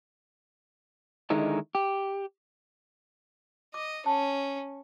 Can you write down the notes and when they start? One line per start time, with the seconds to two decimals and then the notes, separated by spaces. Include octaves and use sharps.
1.30 D3 D#3 G#3 D#4 E4
1.75 G4
3.74 D#5 D6
4.06 C#4 A5